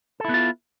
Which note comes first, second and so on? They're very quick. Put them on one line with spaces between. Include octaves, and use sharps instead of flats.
A4 E4 B3 F4